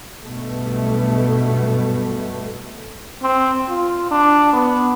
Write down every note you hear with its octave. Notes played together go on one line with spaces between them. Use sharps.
B1 G2 B2 A3
C4
F4
D4
B3